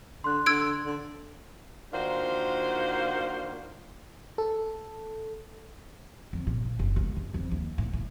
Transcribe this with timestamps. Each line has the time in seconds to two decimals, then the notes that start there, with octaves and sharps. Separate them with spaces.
0.24 D3 C6 F#6
0.46 D3 E6 G#6 D7
0.86 D3
1.93 D#3 A#3 D4 F4 F#4 C5
4.38 A4
6.33 F2
6.47 A#2
6.64 A#2
6.79 F#1
6.96 C#2
7.16 C#2
7.34 F2
7.51 D#2
7.78 A2
7.93 A2